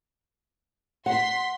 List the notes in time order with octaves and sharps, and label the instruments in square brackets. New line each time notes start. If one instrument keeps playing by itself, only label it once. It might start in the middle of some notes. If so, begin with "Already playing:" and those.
[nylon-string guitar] F#5 [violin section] C6 B6